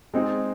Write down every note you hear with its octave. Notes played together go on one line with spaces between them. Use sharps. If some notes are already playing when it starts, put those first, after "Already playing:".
G#3 C4 D#4 G#4